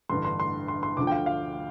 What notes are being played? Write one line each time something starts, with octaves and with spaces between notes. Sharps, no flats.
A1 G2 D3 C6
C6
C6
C6
C6
D2 D3 F3 D6
G5
F5
F5